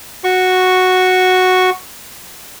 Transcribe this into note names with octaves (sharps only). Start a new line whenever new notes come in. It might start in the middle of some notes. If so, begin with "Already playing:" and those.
F#4 C#6